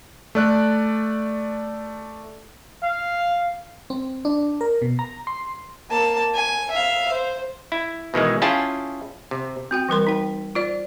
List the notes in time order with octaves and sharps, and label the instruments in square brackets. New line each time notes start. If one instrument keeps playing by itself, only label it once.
[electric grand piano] A3 D5 F#6
[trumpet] F5
[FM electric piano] C4
D4
A#4
B2
A#5
C6
[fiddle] A#3 A5
G#5
E5 F5
C5
[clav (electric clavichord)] E4
B2 D#3 E3 G#3
C#4 E4 F4 G#4 G5 A5
C3
[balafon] C4 F#4 G5
E3 G3 A#4 C6
D#4 G5
F4 C5 D5